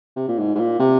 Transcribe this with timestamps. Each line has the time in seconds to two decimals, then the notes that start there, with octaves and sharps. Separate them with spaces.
0.16 C3
0.28 A#2
0.38 G#2
0.55 G#2
0.60 A#2
0.79 C3